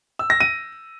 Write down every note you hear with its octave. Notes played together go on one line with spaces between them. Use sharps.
E6
A#6
D#7